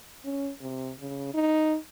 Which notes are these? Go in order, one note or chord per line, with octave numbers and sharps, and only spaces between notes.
C#4
C3
C#3
D#4